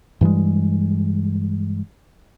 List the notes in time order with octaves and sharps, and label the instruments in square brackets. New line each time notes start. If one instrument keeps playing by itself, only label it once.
[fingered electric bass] G2 E3 G3 G#3